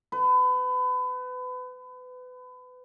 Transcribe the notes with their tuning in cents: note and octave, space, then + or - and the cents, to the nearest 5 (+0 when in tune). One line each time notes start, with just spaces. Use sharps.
B4 +30